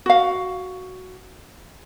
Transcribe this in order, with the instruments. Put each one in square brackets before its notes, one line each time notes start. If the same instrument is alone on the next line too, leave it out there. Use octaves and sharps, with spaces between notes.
[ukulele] F#4 F5